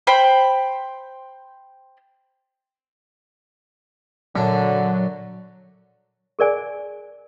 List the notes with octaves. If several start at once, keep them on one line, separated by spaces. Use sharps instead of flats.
C5 G5 B5
F#2 A#2 D3 F#3 D4
G#4 A#4 D5 G#5